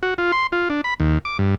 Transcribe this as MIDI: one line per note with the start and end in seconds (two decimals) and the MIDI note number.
0.03 0.14 66
0.18 0.32 65
0.32 0.47 84
0.52 0.69 65
0.70 0.81 62
0.84 0.94 83
1.00 1.18 39
1.25 1.38 86
1.39 1.55 43